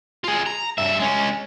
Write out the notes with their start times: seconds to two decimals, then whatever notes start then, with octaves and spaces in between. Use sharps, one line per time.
0.24 F4 G#4
0.46 A#5
0.78 G2 E5
1.00 G#3 C#4